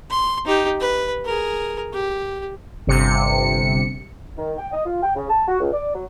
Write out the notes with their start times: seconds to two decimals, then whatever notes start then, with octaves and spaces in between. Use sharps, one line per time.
0.10 C6
0.45 D#4 G4
0.80 B4
1.25 G#4 A#4
1.93 G4
2.87 G1 C3 C#7
4.37 D#3
4.57 G5
4.72 D#5
4.86 F4
5.02 G5
5.15 C#3
5.30 A5
5.48 F#4
5.60 C#2
5.72 D5
5.94 F#3